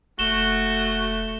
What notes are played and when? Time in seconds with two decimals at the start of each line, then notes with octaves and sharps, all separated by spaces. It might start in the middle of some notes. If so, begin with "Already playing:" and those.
0.19 E1 A3 F#4 E7 G7